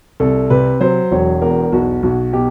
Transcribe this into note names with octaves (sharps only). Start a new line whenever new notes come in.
C2 A4
C3 B4
F#3 C5
E1 C#5
E2 A#4
B1 F#4
B1 F#4
B2 G4